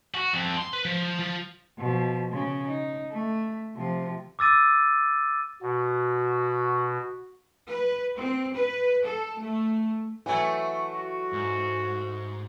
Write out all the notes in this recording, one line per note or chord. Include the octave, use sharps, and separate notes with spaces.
F#4
F2
C6
B4
F3
F3
B2 F3
C#3
D#4
A3
C3 F3
D6 E6 A6 D#7
B2 F#4
B4
C4
B4
A4
A3
E3 F#3 A3 E4
F#4
G#2